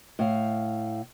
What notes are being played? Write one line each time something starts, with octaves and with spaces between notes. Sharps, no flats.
A2 F5